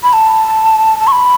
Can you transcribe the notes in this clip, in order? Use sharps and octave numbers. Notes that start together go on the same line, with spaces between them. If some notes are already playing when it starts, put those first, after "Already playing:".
B5
A5
A5
C#6
B5